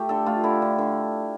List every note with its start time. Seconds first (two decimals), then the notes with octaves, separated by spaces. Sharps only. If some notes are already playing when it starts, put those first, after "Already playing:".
Already playing: A3 G4
0.09 D3 A4
0.26 A3 F4
0.44 D3 E4
0.62 D3
0.78 D3